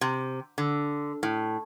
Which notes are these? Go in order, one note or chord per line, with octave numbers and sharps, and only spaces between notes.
C3
D3
A2